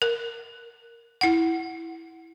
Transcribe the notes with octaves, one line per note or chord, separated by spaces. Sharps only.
A#4
E4 F#5